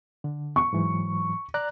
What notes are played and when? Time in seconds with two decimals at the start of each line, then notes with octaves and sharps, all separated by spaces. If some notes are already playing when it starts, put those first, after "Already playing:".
0.24 D3
0.56 C#6
0.73 G#2 E3 F#3
1.54 D5 A#5 F#6